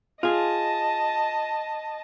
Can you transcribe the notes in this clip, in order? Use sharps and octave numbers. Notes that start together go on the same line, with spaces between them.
F4 G#4 D#5 A5